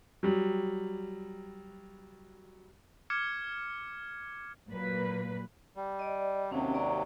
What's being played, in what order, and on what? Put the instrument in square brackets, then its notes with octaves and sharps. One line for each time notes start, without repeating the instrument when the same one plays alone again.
[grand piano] F#3 G3
[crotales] D6 F6 G#6 C#7
[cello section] A#2 F#3 A#3 B4
[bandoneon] G3
[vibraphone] D5 D#5
[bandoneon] D#2 C3 F#3 [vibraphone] C4 C#4
[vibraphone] D5 A#5 C#6